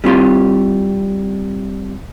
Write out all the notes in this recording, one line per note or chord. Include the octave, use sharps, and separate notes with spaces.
G3 C4 E4 F4 G4 C6